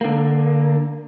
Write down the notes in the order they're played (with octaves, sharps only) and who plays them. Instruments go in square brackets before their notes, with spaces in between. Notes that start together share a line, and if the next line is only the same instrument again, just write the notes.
[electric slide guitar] D3 A#3